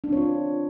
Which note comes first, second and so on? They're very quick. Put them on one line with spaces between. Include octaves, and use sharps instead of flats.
D4 C4 C#5 F4